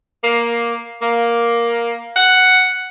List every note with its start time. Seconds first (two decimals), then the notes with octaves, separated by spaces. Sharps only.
0.23 A#3
1.01 A#3
2.16 F#5